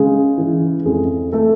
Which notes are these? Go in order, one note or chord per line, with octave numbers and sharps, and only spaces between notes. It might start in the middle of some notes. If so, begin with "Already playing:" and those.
Already playing: C#3 G#3 G#4
E3
F2 G#3 G#4
A3 A4